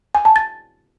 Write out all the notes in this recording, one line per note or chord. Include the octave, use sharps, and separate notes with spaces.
G#5
A5
A6